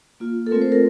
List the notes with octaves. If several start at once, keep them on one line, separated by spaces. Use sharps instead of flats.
A#3 F4
A4
A3 C4 F4 A#4
C5
A#4